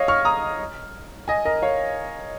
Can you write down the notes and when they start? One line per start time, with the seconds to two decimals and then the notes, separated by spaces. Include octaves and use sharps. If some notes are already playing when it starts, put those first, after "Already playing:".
Already playing: C#5 D#5 F5
0.08 C#6 F6
0.25 A#5 D#6
1.28 D#5 G#5
1.45 A#4 D#5
1.62 C#5 F5